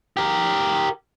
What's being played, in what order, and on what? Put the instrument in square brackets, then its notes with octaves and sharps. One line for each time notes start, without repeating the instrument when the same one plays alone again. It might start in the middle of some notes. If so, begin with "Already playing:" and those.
[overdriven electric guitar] G4 A#4